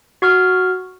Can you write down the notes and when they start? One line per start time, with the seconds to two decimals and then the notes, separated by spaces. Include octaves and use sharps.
0.22 F#4 C#6 F6